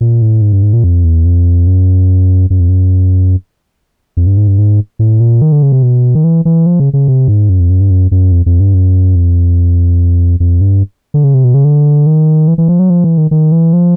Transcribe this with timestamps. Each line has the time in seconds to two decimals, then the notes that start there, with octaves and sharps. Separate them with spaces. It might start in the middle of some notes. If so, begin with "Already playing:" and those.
0.01 A#2
0.22 A2
0.42 G#2
0.53 G2
0.63 G#2
0.73 A#2
0.84 F2
1.04 E2
1.25 F2
1.67 F#2
2.50 F#2
2.60 F2
2.69 F#2
4.17 F2
4.27 G2
4.37 G#2
4.48 G2
4.58 G#2
4.99 A2
5.20 A#2
5.42 D#3
5.52 D3
5.63 C#3
5.72 C3
5.83 B2
6.15 D#3
6.24 E3
6.45 E3
6.66 F3
6.80 C#3
6.93 C#3
7.08 C3
7.28 G#2
7.49 F#2
7.60 F2
7.70 F#2
7.81 G2
7.90 F#2
8.11 F#2
8.32 F2
8.46 F2
8.60 G2
8.74 F#2
9.16 F2
10.40 F2
10.61 G2
11.14 D3
11.24 C#3
11.34 C3
11.44 B2
11.54 C#3
11.65 D3
12.06 D#3
12.48 E3
12.58 E3
12.68 F3
12.79 F#3
12.90 F3
13.04 E3
13.18 D#3
13.31 D#3
13.52 E3
13.73 F3